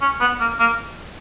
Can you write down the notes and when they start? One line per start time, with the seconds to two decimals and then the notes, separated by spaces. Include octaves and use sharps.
0.02 C#4
0.21 B3
0.40 A#3
0.59 A#3